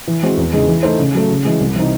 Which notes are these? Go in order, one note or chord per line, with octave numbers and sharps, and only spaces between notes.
E3
G#3 C4 F#4
E2
C#3 G#3 D#4 G#4
E3
A3 D#4 A4 C5
C#3
F#3 A3
C#3
E3 G#3
C2
C3 E3 C4 D#4